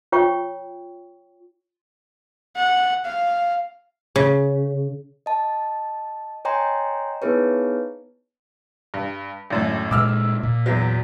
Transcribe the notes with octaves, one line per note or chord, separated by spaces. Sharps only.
F4 C#5 G5 C#6
F#5
F5
C#3
D#5 A5
C#5 D#5 G5 G#5 A#5 C6
B3 D#4 E4 G#4 B4 C#5
G2
G#1 F#2 A2
A#2 G#3 D6 E6 F6
A#2
E2 F#3